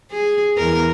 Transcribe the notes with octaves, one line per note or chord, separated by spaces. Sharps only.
G#4
E2 A#4